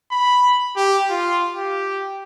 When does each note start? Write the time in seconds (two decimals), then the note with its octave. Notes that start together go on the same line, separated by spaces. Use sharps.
0.11 B5
0.76 G4
1.10 F4
1.56 G4